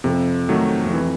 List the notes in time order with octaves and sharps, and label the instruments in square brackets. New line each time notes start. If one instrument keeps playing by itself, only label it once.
[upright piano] F2 [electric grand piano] C3
[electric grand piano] D#3 F#3 A3
[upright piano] F2
[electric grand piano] E3